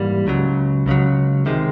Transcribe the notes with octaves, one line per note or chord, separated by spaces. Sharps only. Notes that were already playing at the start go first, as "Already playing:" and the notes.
Already playing: G#2 E3 G3 A#3
C#2 C#3 F#3
C#2 C#3 F#3
C3 D#3 G#3